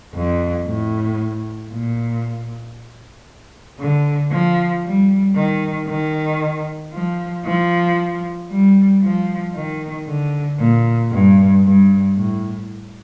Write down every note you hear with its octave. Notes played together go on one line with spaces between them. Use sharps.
F2
A2
A#2
D3
F3
G3
D#3
D#3
F3
F3
G3
F3
D#3
D3
A#2
G2
G2
A2